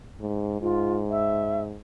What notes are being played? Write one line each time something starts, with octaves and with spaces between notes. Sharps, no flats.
G#2
G#2 F4
E5